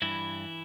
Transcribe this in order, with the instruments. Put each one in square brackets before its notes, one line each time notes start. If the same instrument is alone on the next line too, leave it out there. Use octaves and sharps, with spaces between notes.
[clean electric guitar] G2 E3 E4